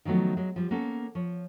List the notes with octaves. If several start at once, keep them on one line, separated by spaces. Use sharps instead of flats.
D#3 F3 F#3 A3 B3
F#3 G#3
F3 G3
A#3 B3 C#4 A4
F3 C#5